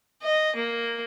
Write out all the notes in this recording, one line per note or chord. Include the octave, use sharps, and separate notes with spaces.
D#5
A#3